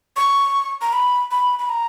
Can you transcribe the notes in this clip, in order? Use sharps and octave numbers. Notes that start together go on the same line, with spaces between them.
C#6
A#5
B5
B5
B5
A#5